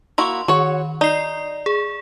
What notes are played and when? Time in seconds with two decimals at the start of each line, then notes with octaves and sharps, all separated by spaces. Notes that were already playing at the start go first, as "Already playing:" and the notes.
0.18 A#3 E4 F#4 C6
0.48 D#3 F#4 C#5
1.01 D#4 D5 C7
1.66 G#4